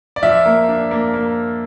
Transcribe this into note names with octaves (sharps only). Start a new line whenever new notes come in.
D5
F3 E5
A#3
D4
A#3
A#3